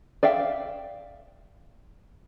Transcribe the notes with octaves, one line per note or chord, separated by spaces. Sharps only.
D5 E5 F5 G5